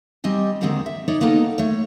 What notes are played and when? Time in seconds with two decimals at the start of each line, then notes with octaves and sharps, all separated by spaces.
0.24 G3 C4 D#5 G#5
0.61 D#2 G#2 D3 D#3 G#3 C4
0.86 E5
1.08 D#4 C#5 D5
1.20 G#3 A#3 B3 D#4 G4 A4
1.58 A3 C#5